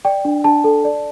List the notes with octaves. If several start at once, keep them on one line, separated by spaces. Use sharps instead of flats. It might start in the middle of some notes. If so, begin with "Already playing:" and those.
D5 G5
D4
D4 A5
A4
D5